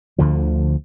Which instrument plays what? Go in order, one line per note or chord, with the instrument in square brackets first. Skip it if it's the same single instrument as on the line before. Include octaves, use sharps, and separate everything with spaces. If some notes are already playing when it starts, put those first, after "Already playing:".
[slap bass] D2 D3 F3